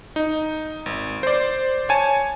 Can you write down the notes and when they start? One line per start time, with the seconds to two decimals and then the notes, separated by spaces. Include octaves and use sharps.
0.16 D#4
0.86 G#1
1.23 C5 D5
1.89 C#5 G#5 A5